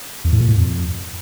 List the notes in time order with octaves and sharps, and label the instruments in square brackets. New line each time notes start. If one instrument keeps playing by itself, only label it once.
[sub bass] E2
A2
A#2
A2
F2